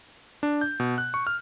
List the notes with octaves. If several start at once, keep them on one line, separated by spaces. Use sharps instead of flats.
D4
G6
B2
F#6
C#6
F6